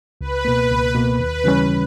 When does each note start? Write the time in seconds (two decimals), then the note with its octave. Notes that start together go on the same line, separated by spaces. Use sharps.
0.21 C#2 B4
0.45 B2 A#3
0.71 C#2
0.94 B2 A#3
1.20 D#2 B4
1.44 C#3 E3 G3 C#4